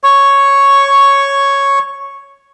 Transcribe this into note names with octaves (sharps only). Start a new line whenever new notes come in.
C#5 C#6